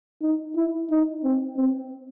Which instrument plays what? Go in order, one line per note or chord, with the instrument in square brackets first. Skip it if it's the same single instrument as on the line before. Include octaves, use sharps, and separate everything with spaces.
[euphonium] D#4
E4
D#4
C4
C4